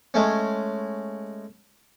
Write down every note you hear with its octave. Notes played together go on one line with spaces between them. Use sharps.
G#3 A3 C#4